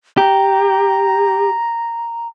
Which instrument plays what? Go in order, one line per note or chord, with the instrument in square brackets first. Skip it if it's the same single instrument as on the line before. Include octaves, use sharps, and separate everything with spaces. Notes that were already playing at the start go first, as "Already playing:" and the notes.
[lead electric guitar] G4 [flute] A#5